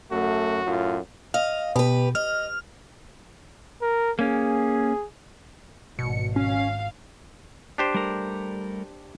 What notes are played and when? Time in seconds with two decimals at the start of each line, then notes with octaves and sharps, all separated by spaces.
0.11 F#2 A3 F#4
0.65 F#2 A2 F4
1.34 D#5 F5
1.76 B2 G4 B4
2.15 D#5 F6
3.82 A#4
4.19 A#3 C#4 G#4
5.99 G#1 B2 C#7
6.36 C#4 F5
7.78 D4 G4 C5
7.94 G3 A3 A#4